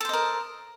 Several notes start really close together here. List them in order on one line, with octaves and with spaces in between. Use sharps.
A4 C5 D#5 A#4